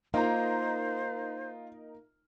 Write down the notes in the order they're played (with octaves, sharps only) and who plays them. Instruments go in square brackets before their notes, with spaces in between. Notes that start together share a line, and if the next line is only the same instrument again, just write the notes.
[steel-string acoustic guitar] A#3 [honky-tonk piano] D#4 A#4 A#5 [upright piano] F4 [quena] C5